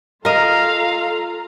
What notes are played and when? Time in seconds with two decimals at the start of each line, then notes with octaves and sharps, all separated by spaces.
0.25 F4 A4 A#4 D#5 F5 A#5